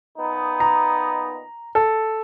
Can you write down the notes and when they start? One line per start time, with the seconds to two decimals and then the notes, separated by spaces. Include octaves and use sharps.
0.18 A#2 B3 D#4
0.60 A#5
1.75 A4